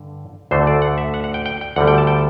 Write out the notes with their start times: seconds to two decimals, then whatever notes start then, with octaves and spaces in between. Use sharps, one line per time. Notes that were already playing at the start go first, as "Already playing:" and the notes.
Already playing: G2 D3
0.51 D2 D3 A3 C5
0.67 D5
0.82 F#5
0.98 E5
1.14 F#5
1.24 F#5
1.34 G5
1.46 G5
1.61 G5
1.76 D2 D3 G3 F#5
1.87 G5
1.98 A5
2.07 G5